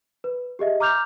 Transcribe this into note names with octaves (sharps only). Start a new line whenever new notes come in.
B4
G4 G#4 D#5 E5
A#5 D6 F6 G6 F7